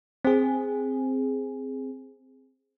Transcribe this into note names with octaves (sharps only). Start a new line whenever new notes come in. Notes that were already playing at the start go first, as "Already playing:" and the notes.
C4 G#4